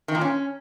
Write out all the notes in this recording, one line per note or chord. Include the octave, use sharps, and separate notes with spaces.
D#3
A#2
C#4